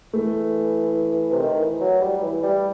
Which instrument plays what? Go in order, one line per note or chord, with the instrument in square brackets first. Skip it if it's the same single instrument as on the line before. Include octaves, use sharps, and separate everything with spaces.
[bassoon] E3 [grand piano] A3
[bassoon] C3
D#3
E3
F#3
G3
E3
G3